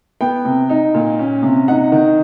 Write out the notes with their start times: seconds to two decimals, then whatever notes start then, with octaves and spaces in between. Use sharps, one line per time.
0.21 B3 G5
0.45 C3
0.69 D#4
0.94 A#2
1.19 C#4
1.43 C3
1.68 D#4 F#5
1.92 D#3